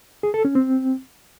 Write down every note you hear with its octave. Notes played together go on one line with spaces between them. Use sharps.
G#4
A4
C#4
C4